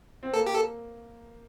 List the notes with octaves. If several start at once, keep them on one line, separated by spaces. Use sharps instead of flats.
C4
A#3 A4
G4
A4